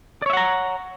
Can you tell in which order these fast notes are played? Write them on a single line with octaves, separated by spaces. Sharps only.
D5 C#5 E5 F#5 A#5